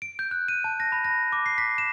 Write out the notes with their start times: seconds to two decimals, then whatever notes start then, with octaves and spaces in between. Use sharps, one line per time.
0.02 D7
0.19 G6
0.31 F#6
0.48 D#7
0.64 A5
0.80 A#6
0.92 B5
1.05 A#6
1.32 D6
1.46 C7
1.58 B6
1.78 E7